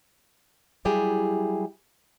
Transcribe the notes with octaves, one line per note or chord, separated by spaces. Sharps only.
F#3 G3 E4 G4 G#4